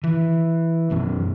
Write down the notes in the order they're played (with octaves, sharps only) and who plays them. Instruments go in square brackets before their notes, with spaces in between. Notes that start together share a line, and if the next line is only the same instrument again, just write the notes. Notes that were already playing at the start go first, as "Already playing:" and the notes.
[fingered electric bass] E3
B1 F#2 B2